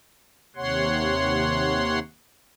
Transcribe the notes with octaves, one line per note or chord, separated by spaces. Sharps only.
D#2 C3 C#5 F#5 C6